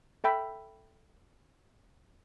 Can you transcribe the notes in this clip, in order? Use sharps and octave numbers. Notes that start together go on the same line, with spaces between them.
A4 E5 G5 B5